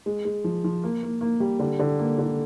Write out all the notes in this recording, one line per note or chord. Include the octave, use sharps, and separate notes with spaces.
G#3
G#3
F3
F3
A#3
A#3
A#3
G3
D3
D3
A#3
D3